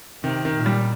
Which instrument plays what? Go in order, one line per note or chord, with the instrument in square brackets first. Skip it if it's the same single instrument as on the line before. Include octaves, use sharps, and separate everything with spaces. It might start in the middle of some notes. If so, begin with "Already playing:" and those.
[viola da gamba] C3 [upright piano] D#3
[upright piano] D#3
[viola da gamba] A#2
[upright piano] G3